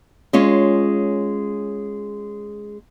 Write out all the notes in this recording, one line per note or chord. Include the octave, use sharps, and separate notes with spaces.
G#3 C#4 F4 C#5